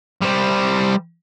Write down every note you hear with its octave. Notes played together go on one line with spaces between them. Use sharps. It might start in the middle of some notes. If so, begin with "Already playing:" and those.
G3 C5